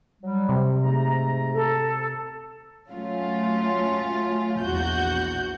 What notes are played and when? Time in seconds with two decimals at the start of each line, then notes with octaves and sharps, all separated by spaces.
0.23 F#3 G3
0.49 C3
0.84 G#2 A3 A#5
1.52 A4
2.90 F#3 A3 C#4 F4
4.61 A#1 E2 F#4 G6